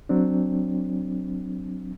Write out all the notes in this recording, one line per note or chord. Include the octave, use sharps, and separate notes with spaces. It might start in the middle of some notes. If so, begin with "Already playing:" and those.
F#3 C4 D4